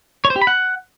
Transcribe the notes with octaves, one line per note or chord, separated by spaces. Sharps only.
C#5
C5
G4
B5
F#5